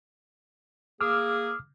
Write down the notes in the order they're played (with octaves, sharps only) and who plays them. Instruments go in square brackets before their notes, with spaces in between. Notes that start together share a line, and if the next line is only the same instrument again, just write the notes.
[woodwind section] A#3 G#4 [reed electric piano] D6 E6 F6